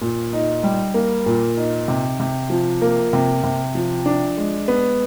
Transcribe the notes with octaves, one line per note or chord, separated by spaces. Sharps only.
A#2
D#4
G3
A#3
A#2
D#4
C3
C3
F3
A#3
C3
C3
F3
D4
G#3
B3